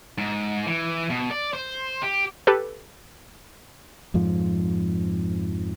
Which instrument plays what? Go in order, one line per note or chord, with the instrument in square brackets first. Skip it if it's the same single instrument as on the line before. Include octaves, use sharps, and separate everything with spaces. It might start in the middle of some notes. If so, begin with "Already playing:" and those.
[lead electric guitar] G#2
E3
B2
D5
C5
G4
[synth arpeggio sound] G4 A4 B4
[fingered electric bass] F2 G#2 F3